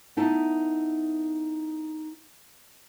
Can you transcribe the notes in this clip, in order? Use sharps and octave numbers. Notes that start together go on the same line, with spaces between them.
B3 D#4 E4 A5